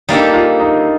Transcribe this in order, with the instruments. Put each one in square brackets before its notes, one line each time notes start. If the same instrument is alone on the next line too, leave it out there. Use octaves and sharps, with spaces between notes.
[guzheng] G3 A#3 D4 A4 [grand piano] D#4
[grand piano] F4
D#4